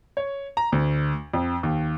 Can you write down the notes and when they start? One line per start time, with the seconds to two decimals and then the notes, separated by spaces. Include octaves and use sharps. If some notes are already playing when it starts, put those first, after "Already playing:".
0.17 C#5
0.57 A#5
0.72 D2
1.34 F2
1.63 D#2